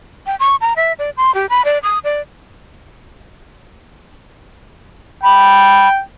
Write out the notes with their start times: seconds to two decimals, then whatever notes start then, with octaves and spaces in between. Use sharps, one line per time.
0.26 G5
0.40 C#6
0.61 A#5
0.76 E5
0.99 D5
1.17 C6
1.35 G4
1.50 B5
1.65 D5
1.83 D#6
2.04 D5
5.24 G5 B5